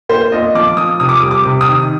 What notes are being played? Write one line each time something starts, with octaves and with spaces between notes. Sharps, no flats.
A#2 C5
A#2 D#5
F3 D6
F3 D#6
C3 D#6
D6
D#6
G3
D6
C3
D#6
D#3